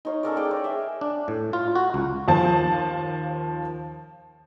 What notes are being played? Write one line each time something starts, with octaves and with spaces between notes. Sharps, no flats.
D#4 C#5 F5
C#4 A4 A#4 D5
G#4 D5 G5
C#5
G#4 E5
D4
A2
F4
F#4
C#2
D#2 F3 F5 A5